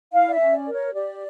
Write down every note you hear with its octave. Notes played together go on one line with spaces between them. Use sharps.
E4 F5
D5
E5
C#4
D5
A#4
C#5
G4 D5